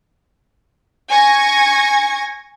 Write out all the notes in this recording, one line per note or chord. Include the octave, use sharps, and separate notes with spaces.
G#5 C#6 G#6 A#6